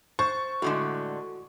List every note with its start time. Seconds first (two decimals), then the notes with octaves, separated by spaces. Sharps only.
0.19 C5 C#6 A6
0.62 A2 D3 G#3 F#4